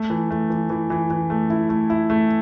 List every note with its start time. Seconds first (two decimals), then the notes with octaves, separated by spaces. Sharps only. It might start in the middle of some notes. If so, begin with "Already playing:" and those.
Already playing: A3
0.10 E3
0.31 A3
0.50 E3
0.70 E3
0.90 E3
1.10 E3
1.30 A3
1.50 E4
1.69 A3
1.90 E4
2.10 A3